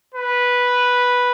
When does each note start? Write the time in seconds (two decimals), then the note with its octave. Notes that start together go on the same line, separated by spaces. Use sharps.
0.14 B4